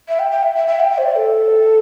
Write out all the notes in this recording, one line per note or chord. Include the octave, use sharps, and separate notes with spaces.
E5
G5
G5
E5
E5
E5
G5
E5
C5
D5
C5
A4